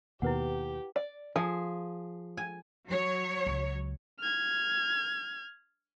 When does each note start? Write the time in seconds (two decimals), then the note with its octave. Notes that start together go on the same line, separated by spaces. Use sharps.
0.22 D#2 B2 E4 G4 B4 F#5
0.96 D5
1.36 F3 G#4
2.37 G#5
2.88 F#3 C#5
3.46 C#2
4.20 F6 G#6